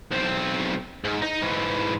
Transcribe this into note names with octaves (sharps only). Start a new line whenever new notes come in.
B1 C4
G#2
D#4
G#2 E3